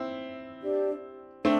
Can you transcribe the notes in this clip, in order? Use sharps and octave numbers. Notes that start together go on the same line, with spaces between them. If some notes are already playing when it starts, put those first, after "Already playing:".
Already playing: C4 E4
D4 G4 D5
A3 C4 D4